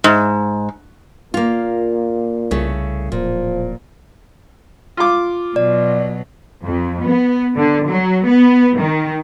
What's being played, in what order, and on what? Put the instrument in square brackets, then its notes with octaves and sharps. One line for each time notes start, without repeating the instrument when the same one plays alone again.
[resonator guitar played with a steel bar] G#2
[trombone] A#2 [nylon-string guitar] A#3 F4
[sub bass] C2 [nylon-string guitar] C#3 A3
[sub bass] D1 [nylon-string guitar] A#2 [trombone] F3
[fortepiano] F4 D6
[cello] B2 F#3 [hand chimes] D5
[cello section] F2
B3
D3
F#3
B3
D#3